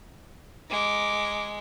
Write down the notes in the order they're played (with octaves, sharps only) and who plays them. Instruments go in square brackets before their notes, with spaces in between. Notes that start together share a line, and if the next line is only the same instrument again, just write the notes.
[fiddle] G#3 [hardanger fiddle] A#5 D6